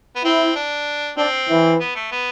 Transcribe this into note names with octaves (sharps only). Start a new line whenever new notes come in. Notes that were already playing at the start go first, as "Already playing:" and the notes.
B3
C4 E4
D4
C4 D4
E3
B3
A3
B3